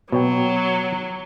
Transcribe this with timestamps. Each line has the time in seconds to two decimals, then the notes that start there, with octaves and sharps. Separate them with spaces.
0.12 B2 F#3 C#5 G5